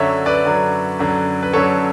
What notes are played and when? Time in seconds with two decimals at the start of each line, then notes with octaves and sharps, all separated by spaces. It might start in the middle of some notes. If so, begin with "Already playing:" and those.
Already playing: F#2 D3 F#3 C#5 E5
0.26 B4 D5
0.44 F#2 D3 F#3
0.99 F#2 D3 F#3
1.43 B4
1.53 F#2 D3 F#3 A4 C#5